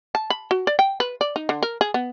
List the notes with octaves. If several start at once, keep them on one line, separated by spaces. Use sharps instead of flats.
A5
B5
F#4
D5
G5
B4
D5
D#4
D3
A#4
G#4
B3